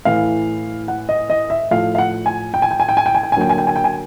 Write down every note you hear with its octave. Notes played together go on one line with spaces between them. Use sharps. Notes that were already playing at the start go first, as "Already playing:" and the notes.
A2 E3 A3 F5
F#5
D#5
D#5
E5
A2 F3 A3 F5
F5
F#5
G#5
G5
G#5
G5
G#5
G5
G#5
G5
G#5
G5
G#5
D3 F#3 A#3 G5
G#5
G5
G#5
G5
G#5